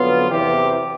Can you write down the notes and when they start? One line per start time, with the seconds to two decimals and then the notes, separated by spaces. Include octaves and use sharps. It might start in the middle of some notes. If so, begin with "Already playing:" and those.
Already playing: F2 D3 F#3 B3 F4
0.28 E2 C3 E3 G4